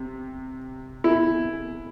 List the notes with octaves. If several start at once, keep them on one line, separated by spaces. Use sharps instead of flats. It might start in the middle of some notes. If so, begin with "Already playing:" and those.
Already playing: C3
E4